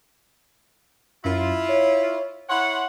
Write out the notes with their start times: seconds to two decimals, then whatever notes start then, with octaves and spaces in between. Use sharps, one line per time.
1.25 F#2 E4 F4
1.69 C#5
2.50 E4 C#5 F#5 C6